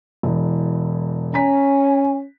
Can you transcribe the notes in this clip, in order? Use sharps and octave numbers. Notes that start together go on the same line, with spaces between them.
E1 E2
C#4 G#5 A#5 B6